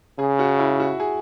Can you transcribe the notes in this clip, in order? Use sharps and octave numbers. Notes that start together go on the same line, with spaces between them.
C#3 G#4
F#4
E4
F#4
G#4